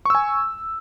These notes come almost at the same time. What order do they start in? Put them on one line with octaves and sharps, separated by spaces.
C#6 E6 G#5